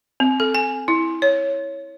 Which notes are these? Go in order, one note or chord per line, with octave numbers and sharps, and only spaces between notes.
C4
A4
G#5
E4
C#5